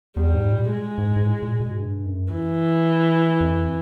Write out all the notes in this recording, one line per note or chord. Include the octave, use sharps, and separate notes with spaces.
E2 G3
G#2
A#2
G#3
G#2
G#2
A2
A#2
B2
G#2
G2
F#2
E3
F2